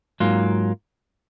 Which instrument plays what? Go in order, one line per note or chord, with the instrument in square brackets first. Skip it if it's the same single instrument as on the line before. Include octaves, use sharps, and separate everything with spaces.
[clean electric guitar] G#2 F#3 A#3 F4